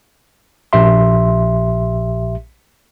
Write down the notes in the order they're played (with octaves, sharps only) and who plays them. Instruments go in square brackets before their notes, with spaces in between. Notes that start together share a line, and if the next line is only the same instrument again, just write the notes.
[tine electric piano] A#1 G4 E5 C6